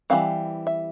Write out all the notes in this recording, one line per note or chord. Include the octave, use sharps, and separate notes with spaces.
E3 G3 C4 F5
E5